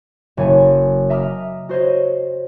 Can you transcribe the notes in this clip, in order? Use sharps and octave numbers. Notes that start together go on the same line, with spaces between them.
F#1 C#5 G#5
D#5 E5 A#5 D6 D#6 F6
F#4 C5 C#5 D#5